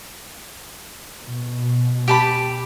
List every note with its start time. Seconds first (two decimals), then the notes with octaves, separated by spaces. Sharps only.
1.25 B2
2.08 G4 A5 B5